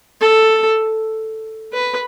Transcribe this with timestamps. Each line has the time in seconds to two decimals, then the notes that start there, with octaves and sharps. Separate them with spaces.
0.21 A4
1.73 B4